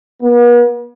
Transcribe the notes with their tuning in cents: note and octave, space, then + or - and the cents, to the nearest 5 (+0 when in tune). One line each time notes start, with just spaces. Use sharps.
B3 -45